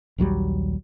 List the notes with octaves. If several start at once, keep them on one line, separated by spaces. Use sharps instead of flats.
A#1 D#2 F#3 G3